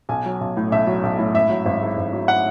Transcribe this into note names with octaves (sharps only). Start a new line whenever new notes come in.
B1 G#5
F#3
B1
A2
B1 E5
F#3
B1
A2
G#1 E5
F#3
G#1
G#2
G#1
F#3
F#5